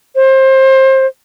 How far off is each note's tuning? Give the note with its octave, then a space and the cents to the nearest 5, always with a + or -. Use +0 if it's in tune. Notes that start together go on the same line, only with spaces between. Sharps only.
C5 +25